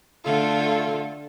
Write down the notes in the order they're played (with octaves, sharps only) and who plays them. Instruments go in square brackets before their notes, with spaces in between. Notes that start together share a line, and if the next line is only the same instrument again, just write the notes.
[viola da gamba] D3 A4 [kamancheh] A3 F4